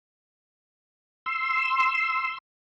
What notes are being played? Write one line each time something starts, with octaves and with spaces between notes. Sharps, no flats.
C6 E6